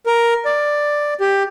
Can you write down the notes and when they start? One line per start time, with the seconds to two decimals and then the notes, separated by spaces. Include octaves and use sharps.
0.06 A#4
0.45 D5
1.20 G4